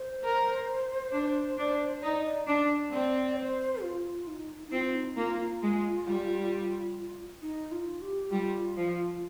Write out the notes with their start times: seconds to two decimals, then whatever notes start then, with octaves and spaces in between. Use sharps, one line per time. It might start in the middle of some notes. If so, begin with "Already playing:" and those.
Already playing: C5
0.23 A#4
1.12 D4
1.58 D4
2.03 D#4 D5
2.25 D5
2.47 D4 D5
2.92 C4 D5
3.37 C5
3.83 F4
4.27 D#4
4.68 D#4
4.72 C4 F4
4.95 D#4
5.17 A#3 F4
5.40 F4
5.62 G#3
6.07 G3
7.42 D#4
7.72 F4
8.02 G4
8.31 G3 F4
8.77 F3